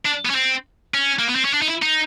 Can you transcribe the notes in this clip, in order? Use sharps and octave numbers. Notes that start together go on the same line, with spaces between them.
D4
B3
C#4
C4
C#4
A#3
B3
C4
C#4
D4
D#4
E4
D#4